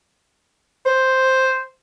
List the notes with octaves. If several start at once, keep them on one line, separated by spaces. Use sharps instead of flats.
C5